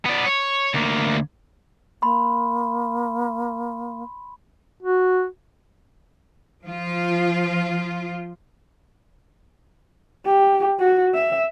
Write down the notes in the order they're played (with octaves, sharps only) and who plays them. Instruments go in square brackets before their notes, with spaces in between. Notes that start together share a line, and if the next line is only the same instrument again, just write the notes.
[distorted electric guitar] B3 D5
C#5
D2 A#3
[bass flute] A#3 [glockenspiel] B5 C6
[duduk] F#4
[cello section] F3 F4
[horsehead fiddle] G4
F#4
E5